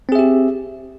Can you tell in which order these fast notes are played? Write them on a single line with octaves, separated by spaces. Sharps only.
C4 G#4 E5 G4